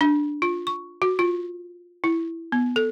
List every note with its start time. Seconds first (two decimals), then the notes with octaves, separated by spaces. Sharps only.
0.01 D4
0.42 F4
0.67 C#6
1.02 F#4
1.19 F4
2.04 E4
2.52 B3
2.76 A4